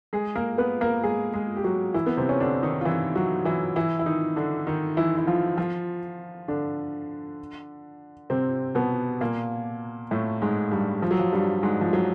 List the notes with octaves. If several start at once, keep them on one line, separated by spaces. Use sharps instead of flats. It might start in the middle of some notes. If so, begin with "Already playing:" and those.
G#3 G#4
A#3 A#4
B3 B4
A#3 A#4
G#3 G#4
G#3 G#4
G4
F#3 F#4
E3 E4
B3
C3 C4
C#4
D3 D4
D#3 D#4
F4
E3 E4
F#3 F#4
E3 E4
E3 E4
E4
D#3 D#4
D3 D4
D#3 D#4
E3 E4
E4
F3 F4
F3 F4
D3 D4
C3 C4
B2 B3
A#2 A#3
A2 A3
G#2 G#3
G2 G3
F3
F#3
F3
G2 G3
G#2 G#3
F3
F#3